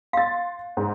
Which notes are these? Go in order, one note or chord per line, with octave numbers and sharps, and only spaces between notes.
F5 C6 A6
G#2